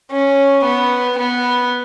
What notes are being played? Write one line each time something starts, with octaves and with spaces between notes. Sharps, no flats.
C#4
B3
B3